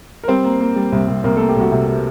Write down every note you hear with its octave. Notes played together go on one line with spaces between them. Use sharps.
A#4
G3 C4 C5
A#3
A#3
G3
C2
C2
C2 A#3 A#4
A3 A#3 A4
G4
C2 F#4
C3
G3